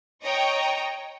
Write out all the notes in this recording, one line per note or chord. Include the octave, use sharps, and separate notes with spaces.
C#5 D#5 G5 A#5 C#6